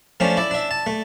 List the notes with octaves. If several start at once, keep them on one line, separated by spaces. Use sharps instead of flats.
F3 A3 C#4 D4
E4 D5
D4 E5
A5
A3